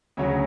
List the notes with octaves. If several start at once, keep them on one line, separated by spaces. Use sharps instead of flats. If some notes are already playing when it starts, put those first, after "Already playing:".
D2 C#3 F#3 C#5